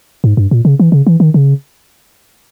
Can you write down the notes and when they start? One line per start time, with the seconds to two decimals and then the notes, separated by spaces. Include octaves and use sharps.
0.24 G#2
0.37 G2
0.51 A#2
0.65 C#3
0.80 E3
0.92 C#3
1.07 E3
1.20 D#3
1.34 C#3